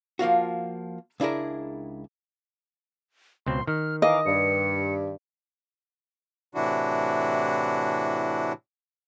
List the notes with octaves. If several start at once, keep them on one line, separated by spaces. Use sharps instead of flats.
F3 A#3 F4 F#4
C#2 D4 E4 G#4 A#4
C#2 B2 C4 C6
D#3 F6
E3 A#4 D#5 F5 D6
G2 C#7
A2 C3 E3 D4 E4 F#4